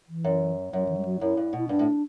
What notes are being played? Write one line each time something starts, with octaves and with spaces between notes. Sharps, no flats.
E3
F#2
F#2 F#3
E3
G3
F#3
F#2 E4
G2
B2 E4
G2 D4
A2